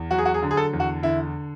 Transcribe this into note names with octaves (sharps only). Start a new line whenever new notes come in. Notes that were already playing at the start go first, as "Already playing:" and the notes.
Already playing: E2
F#3 F#4
G#4
F#4
G#4
D3
G#4
A4
E2
F#4
D3 E4